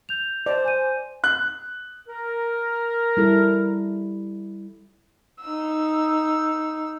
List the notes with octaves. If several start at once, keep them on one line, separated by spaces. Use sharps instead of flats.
G6 F7
C5 D5
G#5 G6 D#7
F#6
A#4
G3 E4 A4
D#4 E6